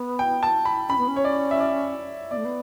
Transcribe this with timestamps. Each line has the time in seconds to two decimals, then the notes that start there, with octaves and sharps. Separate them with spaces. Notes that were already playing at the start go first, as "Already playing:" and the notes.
Already playing: B3
0.19 G5
0.43 A5
0.65 B5
0.89 C#4 B5
0.98 B3
1.08 C#4
1.16 C#5
1.24 D5
1.51 E5
1.60 D5
2.31 B3 D5
2.37 A3
2.45 B3